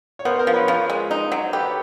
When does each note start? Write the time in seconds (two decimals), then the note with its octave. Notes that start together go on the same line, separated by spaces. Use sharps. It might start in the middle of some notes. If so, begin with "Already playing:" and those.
0.19 C#5
0.25 B3 A#4 C5
0.39 A#4 C5
0.47 F3
0.54 B4 C#5
0.68 F3 A#4 C5
0.90 G#3
1.11 D#4
1.32 F#3
1.45 C5
1.53 G4 A4 B4
1.65 C#5